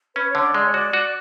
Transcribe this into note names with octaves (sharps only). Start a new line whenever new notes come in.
C#4 B4
C#5
D3
D5
G#3 D5
C#5
F#4 D5
F#4